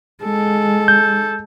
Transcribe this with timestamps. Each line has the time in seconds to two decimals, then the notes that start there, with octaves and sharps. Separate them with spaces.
0.23 G#3 A4
0.88 G6